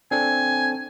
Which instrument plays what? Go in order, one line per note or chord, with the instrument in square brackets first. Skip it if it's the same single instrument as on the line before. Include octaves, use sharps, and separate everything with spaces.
[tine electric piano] C4 D4 A4 [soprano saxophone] G#5